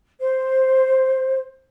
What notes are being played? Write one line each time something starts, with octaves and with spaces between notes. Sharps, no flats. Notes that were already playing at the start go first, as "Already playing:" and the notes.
C5